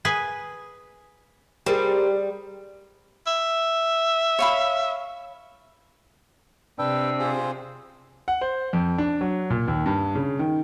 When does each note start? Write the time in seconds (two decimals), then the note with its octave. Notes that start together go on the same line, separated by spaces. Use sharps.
0.05 G#4 B4 G#5
1.66 G3 G4 G#4 A#4 C5
3.27 E5
4.39 C#5 F5 B5
6.79 C3 D4 B4 G5 E6
7.19 F4 G#4 C5
8.28 F#5
8.41 C5
8.73 F2
8.98 D4
9.21 F#3
9.50 A#2
9.68 D#2
9.86 G2
10.15 C#3
10.39 D#3